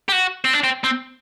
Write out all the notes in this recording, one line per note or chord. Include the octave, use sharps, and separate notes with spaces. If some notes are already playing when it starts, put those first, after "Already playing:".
G4
F#4
C4
D4
C4
C4